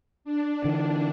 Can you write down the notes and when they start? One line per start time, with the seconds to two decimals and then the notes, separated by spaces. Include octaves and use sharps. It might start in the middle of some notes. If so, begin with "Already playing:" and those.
0.25 D4
0.65 D3 E3